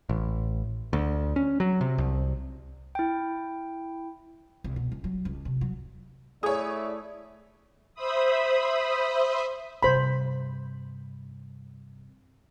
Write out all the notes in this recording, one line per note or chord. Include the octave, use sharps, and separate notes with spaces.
A1
D2
C#4
F#3
C3
C2
E4 G5
C2
B2
C#2
F#3
C#2
C3
F#3
A3 E4 G#4 C#5 D5 D#6
C5 E5 B5 D#6
G2 C3 C5 B5